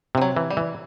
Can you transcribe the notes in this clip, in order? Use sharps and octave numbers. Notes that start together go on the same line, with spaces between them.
C3 F3
F#3
E3
G3
E3